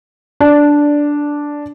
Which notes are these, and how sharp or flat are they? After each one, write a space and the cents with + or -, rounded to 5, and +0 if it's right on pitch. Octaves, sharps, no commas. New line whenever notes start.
D4 -5 D5 +0